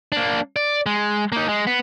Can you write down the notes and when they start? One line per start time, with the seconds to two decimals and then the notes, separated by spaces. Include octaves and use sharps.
0.12 A#3 D4
0.56 D5
0.86 G#3
1.32 A#3 D#4
1.49 G#3
1.67 B3